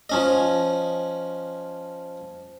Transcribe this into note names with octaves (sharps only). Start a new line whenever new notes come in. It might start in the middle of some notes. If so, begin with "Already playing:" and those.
F3 C#4 D#5